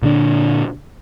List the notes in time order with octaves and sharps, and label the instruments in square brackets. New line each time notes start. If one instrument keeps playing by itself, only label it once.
[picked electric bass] A#2 D3 D4